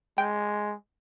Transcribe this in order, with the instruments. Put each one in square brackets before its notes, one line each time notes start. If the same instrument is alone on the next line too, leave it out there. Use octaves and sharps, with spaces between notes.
[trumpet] G#3 [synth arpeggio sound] G5